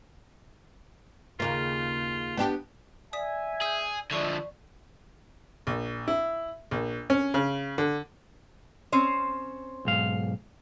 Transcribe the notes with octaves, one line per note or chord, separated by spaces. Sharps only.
D#2 C#3 A#3 F4
B3 D4 G4
D5 E5 G#5 D#6 B6
G#4 E6 G6
D3 F3 G#3 A4 D5 E5 C#6 C7
A#1
E4
A#1
C#4
C#3
D3
C4 C#4 C5
B1 G#2 F5